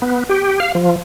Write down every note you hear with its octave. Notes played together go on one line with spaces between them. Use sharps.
B3
G4
F5
F3